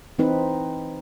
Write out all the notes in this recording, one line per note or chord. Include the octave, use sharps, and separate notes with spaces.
E3 C4 D#4 B4